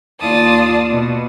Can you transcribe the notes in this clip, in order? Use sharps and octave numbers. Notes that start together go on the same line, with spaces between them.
D#2 F4 D5 A5 D#6
B2